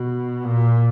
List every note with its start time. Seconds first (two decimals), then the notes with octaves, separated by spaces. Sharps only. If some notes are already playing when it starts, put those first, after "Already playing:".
Already playing: B2
0.44 A#2